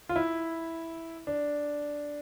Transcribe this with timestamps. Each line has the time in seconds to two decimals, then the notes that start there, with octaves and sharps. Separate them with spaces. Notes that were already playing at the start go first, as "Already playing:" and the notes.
0.09 F4
0.16 E4
1.27 D4